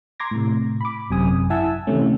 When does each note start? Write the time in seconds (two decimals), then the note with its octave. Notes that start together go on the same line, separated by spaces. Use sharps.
0.20 A#5 C6 D6 G#6 A#6
0.31 A2 C3
0.81 B5 D6
1.10 G#1 F#2 C3 G#5 D#6
1.50 E4 E5 F#5 G#5 A5 E6
1.87 C3 D#3 E3 A3 C#4